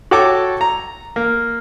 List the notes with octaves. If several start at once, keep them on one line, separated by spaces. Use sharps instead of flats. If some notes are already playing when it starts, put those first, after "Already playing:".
F#4 A4 C#5 G5 A5 D6
A#5
A#3